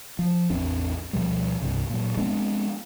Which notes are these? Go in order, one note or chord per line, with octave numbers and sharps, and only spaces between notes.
F3
A1 E2 C4 D4
D2 B2 F3 G3
C2 G2 C3
A#2 F#3
G#3 B3 C4 D4